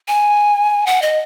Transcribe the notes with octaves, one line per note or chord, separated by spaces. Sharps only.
G#5
F#5
D#5